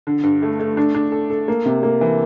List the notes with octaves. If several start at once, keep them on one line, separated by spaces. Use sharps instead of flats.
D3
G2
A3
A3
D4
D4
A4
A4
A#3
C3
A#3
E3